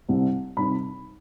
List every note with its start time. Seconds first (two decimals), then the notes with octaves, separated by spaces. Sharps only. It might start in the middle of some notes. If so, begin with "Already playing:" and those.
0.09 C2 C3 G3
0.57 C3 D#3 G3 B5